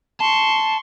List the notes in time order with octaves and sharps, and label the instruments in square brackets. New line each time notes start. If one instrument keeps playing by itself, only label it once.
[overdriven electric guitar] A5 [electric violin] C6 C#6